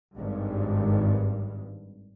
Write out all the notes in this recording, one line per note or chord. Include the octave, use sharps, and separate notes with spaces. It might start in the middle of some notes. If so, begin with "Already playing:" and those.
G#1 G2